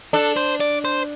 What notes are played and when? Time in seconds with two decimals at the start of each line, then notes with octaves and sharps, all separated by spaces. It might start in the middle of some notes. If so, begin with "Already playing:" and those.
0.13 D4 A4
0.37 C5
0.60 D5
0.85 C5